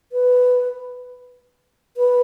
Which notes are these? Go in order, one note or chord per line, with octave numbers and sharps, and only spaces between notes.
B4
B4